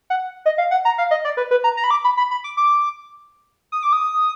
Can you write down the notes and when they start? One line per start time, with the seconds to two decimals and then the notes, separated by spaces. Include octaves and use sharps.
0.10 F#5
0.46 D#5
0.58 F5
0.71 F#5
0.85 A#5
0.98 F5
1.11 D#5
1.25 D5
1.37 B4
1.51 B4
1.64 A#5
1.77 A#5
1.84 B5
1.91 D6
2.04 B5
2.17 B5
2.31 B5
2.44 D6
2.57 D6
3.72 D#6
3.83 D6
3.93 D#6